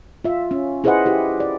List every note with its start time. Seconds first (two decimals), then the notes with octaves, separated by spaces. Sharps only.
0.24 F4 E5
0.51 C#4
0.84 E4 G#4 B4 C5 D#5 F#5
1.06 E4 G4
1.40 D5